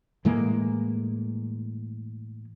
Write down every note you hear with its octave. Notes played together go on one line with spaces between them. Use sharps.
A2 E3 G#3 A#3